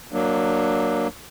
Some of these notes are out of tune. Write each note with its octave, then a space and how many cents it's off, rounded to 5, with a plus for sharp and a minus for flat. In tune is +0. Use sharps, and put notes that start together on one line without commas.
F#3 +0 A#3 +0 D4 +20